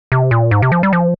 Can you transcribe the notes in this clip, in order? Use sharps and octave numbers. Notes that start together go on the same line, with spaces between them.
C3
A#2
G#2
C3
F3
G3
F3